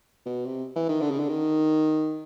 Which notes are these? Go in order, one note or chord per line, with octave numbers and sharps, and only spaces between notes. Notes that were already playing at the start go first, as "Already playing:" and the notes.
B2
C3
E3
D#3
D3
C#3
D3
D#3